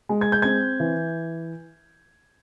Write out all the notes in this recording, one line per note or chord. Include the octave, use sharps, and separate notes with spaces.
G#3
G#6
G6
C4 G#6
E3